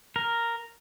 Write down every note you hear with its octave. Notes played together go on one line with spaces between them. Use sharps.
A#4